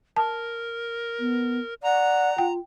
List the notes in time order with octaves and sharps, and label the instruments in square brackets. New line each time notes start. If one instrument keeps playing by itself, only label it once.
[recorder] A#4 [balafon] A5
[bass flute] B3
[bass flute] D5 [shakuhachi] F#5 [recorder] A#5
[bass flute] F4 [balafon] G5